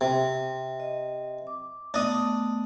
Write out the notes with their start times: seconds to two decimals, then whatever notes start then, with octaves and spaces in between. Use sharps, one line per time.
0.01 C3
0.80 D#5
1.47 D6
1.94 A3 B3 D4 D#5